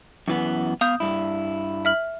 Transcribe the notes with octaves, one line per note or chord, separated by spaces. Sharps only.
F#2 E3 B3
B3 F5 D#6 G6
G2 E4
E5 F6 F#7